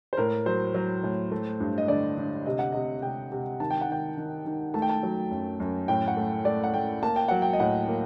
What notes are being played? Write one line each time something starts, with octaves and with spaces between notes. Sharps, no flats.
C5
A2 A#4
F#3 C5
F#3
A2
A3
G2
D#5
D3 D5
D3
C3 D#5
F#5
C3 D#5
C3 G5
C3
D#3 A5
G5
F#5
D#3 G5
D#3
D#3
A3 A5
G5
A5
F#3
F#2
F#2
A2 G5
F#5
A3
A3 D5
F#5
A3 G5
A#3 A5
G5
F#3 F#5
G5
D#5
A2 F#5
A#3